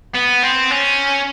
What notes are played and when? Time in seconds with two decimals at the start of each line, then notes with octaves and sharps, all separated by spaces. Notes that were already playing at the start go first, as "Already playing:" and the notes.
0.15 B3
0.43 C4
0.71 C#4